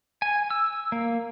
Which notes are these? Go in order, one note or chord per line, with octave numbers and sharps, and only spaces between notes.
G#5
E6
A#3